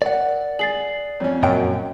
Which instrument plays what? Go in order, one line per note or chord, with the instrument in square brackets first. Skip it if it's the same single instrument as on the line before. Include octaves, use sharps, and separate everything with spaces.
[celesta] A#4 [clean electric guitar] D5 F#5
[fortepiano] G#4 [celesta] A6 C7 F#7
[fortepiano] F2 C#4 [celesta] C#5
[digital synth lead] F#2 [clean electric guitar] A#2 G5 [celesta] D#5